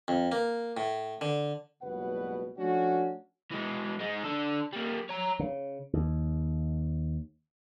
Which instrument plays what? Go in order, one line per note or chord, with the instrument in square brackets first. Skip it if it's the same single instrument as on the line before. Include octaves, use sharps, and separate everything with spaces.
[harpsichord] F2
A#3
A2
D3
[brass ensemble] F#1 C#2 B2 G3 B4 F#5
F3 A3 C#4 D4 F#4
[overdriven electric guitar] E3 G#3
G#3 D#4
D3 A4
G3 A#3
C#5 A#5
[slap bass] C#3
D#2